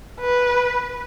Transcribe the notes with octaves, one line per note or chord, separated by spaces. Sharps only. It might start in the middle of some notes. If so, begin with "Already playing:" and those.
B4